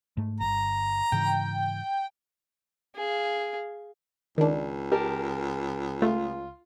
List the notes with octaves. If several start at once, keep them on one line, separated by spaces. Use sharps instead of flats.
G#2 A3
G1 A#5
G#2 C#3 E3 G5
G#4 F5
C#2 D#3 D4
G4 A#4 A5
A3 F4